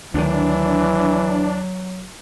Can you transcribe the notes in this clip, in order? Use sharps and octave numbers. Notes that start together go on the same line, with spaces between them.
D2 D#3 E3 F#3 D4